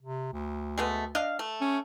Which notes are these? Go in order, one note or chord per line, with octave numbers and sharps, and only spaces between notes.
C3
D2
G#3 A3 B3
D4 D#5 F5
A3
C#4